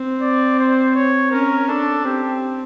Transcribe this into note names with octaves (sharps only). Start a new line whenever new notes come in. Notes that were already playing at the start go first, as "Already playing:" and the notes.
Already playing: C4
D5
C5
C#5
C#4 A#4
D4 A4
C4 G4